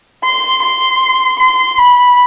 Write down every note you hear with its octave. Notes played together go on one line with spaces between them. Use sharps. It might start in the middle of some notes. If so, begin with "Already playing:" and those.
C6
C6
C6
B5